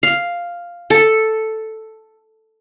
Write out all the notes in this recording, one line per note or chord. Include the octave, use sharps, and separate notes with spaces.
F5
A4